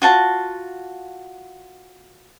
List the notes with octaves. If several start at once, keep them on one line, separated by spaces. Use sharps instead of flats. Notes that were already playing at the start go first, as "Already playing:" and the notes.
F4 F#4 A5